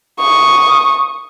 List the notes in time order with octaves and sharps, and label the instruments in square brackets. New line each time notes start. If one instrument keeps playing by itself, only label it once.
[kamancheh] C#6 D#6